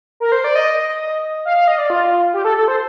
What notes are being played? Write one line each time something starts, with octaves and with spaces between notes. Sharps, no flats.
A#4
C5
D5
D#5
F5
F5
D#5
D5
F4
G4
A4
A4
C5